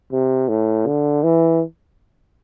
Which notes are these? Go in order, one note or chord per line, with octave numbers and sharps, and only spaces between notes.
C3
A2
D3
E3